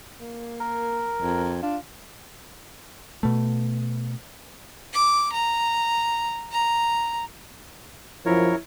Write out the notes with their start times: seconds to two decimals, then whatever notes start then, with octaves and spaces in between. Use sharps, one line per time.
0.19 A#3
0.60 A#4
1.21 F2
1.62 D4 F4
3.23 B2 A3
4.93 D6
5.32 A#5
6.51 A#5
8.26 F#2 F3 E4 A#4 C#5